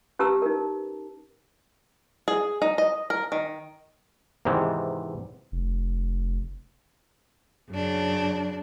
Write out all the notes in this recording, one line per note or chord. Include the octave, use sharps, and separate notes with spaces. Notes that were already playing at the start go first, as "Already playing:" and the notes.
C#4 G4 B4 A5 A#5 E6
D#4 A#4
G#4
D#4
D#5
A#4
D#3
E2 G#2 C3 D#3 E3
F1
F#2 C#3 D4